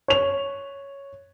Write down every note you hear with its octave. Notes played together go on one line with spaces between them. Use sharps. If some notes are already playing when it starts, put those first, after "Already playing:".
C#5 F7